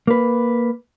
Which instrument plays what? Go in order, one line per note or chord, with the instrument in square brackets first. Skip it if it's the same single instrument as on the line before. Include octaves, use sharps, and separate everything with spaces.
[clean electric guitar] A#3 B4